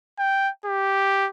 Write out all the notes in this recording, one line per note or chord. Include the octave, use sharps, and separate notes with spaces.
G5
G4